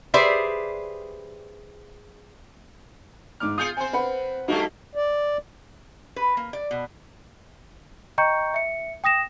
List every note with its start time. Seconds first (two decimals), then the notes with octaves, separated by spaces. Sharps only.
0.14 G4 G#4 B4 C5 D5 E5
3.40 G#2 D6 F6
3.58 F4 G#4 D#6 G6 C#7
3.77 C4 C5 G#5
3.93 B4 F#5 B5
4.48 G3 A3 A#3 D#4 F#4 A4
4.95 D5
6.16 B4
6.37 A#3
6.53 D5
6.71 B2
8.18 D#5 G5 A#5 C#6 G6 C#7
8.54 E5 C#7
9.04 G5 D#6 A#6 E7